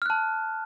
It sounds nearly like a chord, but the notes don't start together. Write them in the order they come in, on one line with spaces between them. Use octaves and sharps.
F6 F#6 A5